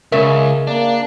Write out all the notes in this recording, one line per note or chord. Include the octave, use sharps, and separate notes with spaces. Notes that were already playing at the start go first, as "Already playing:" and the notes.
C#2 C#3 A#4 E5
A#3 D4